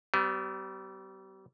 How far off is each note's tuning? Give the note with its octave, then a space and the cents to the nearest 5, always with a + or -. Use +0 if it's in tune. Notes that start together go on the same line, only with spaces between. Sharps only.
G3 -35 B3 +40